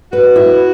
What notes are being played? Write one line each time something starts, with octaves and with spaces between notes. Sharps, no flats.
F#4 B4
E4